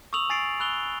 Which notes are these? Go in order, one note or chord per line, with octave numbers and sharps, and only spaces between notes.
C#6 D#6 E6 F7 F#7
G#5 A6 C7 D7
B5 E6 F#6 F7 G7